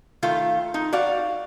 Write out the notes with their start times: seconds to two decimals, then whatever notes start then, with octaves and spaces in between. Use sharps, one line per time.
0.23 D#3 A3 F4
0.74 D#4
0.93 F#4 D5 F5